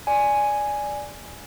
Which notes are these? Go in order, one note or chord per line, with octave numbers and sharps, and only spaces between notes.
D5 G#5